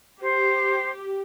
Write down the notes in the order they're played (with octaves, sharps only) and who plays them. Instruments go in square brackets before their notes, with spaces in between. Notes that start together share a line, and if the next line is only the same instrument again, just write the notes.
[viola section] G4 [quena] C5